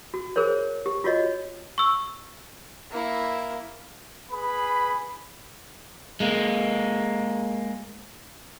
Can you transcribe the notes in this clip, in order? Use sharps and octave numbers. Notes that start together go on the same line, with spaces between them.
F#4
G#4 A#4 C5 C#5
G4
F4 F#4 C#5 D#5
C#6 E6
A#3 E4
G#4 B4 B5
G#3 A#3